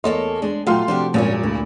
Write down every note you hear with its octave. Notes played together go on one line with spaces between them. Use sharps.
E2 A#3 A4 C#5 D#5 C6
G#3 D4 G#4
A#2 F#3 A3 F4 F5 G5 C6
C3 F3 D4 F#4 G4
D#1 G#1 A#2 C#4 D4 C#5
D2 E4